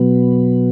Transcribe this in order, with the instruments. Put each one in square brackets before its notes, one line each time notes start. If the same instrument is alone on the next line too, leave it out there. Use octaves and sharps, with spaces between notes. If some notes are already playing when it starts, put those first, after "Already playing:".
Already playing: [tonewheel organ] B2 F#3 B3